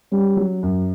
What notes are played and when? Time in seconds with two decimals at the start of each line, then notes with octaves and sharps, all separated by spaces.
0.12 G3 C#4
0.37 F#3
0.63 F#2